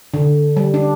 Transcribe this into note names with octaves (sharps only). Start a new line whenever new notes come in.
D3
G3
D4